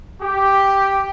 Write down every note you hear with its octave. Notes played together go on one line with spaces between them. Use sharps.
G4